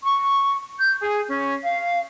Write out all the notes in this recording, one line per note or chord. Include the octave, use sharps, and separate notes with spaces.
C#6
G6
G#4
C#4
F5